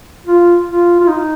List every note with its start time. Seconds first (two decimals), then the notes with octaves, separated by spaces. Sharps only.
0.26 F4
0.68 F4
1.00 F4
1.08 D#4